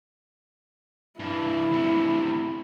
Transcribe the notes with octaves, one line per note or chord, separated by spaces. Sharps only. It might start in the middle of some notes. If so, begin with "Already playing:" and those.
G2 E3 E4
D2 C3